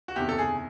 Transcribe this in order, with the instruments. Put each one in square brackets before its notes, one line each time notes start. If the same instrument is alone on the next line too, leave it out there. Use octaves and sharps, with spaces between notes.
[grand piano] F#4
F#1 E2 C3 D#3 G4
A4
G#4